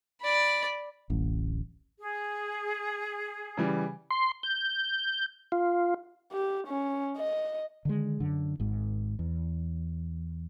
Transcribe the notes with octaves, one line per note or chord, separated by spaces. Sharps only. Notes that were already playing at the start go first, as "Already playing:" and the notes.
D5 B5
D1 A1
G#4
C#3 E3 G3
C6
G6
F4
G4
C#4
D#5
D3 D#3 G#3
F#2 D3
G#1 G#2
E2